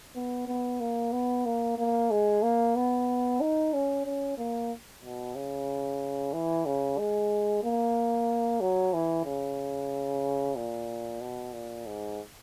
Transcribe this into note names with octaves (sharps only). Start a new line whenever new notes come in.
B3
B3
A#3
B3
A#3
A#3
G#3
A#3
B3
D#4
C#4
C#4
A#3
B2
C#3
E3
C#3
G#3
A#3
F#3
E3
C#3
A#2
B2
A#2
G#2